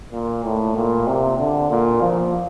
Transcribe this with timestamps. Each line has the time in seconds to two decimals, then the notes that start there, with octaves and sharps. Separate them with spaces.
0.12 A#2
0.44 A2
0.76 A#2
1.07 C3
1.38 D3
1.70 A#2
2.02 F3